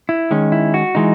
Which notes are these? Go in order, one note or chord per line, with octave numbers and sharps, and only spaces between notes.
E4
D#3 G#3 C#4
E4
F#4
E3 G#3 D#4